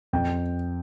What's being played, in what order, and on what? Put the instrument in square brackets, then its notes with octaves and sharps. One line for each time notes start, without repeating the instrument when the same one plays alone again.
[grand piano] F2 G5